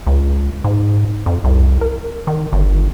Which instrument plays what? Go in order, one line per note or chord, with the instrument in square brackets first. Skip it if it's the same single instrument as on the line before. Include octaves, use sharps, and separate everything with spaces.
[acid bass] C#2
G#2
F2
C2
A#4
D#3
G1